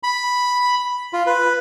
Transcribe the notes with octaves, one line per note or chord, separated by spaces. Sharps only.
B5
F4
B4